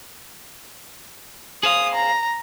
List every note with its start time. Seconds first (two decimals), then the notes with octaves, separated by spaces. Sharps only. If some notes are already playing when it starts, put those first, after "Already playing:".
1.63 G#4 C5 F5 D#6
1.95 A#5